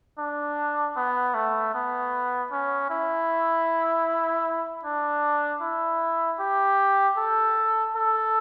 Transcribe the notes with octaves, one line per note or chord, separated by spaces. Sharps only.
D4
B3
A3
B3
C#4
E4
D4
E4
G4
A4
A4